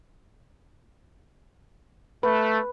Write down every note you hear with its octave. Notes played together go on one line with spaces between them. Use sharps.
A3 B4